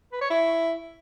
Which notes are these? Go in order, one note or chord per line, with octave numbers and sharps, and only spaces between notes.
B4
C#5
E4